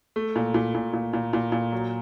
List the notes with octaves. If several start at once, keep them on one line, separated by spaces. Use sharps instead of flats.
A3
A#2
A#2
A#2
A#2
A#2
A#2
A#2
F#3